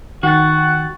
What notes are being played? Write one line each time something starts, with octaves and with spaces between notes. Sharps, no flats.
D#3 F#4 F#5 G5 A6